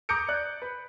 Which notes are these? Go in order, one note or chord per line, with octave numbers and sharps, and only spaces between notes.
A#5 D6 D#6 G6 C#7 D7
D5 F#6
B4